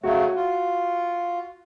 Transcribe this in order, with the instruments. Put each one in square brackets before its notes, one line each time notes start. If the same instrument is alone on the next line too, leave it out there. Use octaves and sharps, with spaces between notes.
[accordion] C#3 F#3 A3 [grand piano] F#4
[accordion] F4